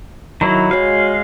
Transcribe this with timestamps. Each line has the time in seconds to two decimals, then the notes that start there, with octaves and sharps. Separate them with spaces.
0.41 D#3 F#3 E4 B5
0.71 G#3 F#4 C#5 F5